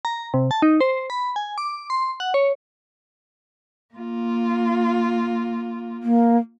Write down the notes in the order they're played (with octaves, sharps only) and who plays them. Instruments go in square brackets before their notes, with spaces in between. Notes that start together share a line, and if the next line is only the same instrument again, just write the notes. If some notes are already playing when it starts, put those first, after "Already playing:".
[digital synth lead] A#5
C3
A5
D#4
C5
B5
G#5
D6
C6
F#5
C#5
[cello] A#3 F4
[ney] A#3